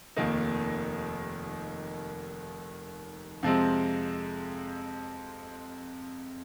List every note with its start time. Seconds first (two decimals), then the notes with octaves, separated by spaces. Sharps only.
0.16 F1 D#2 D#3 A#3 D#4
3.43 F2 C3 F3 G#3 C4